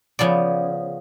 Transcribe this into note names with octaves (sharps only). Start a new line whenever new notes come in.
C#3 F3 B3 D5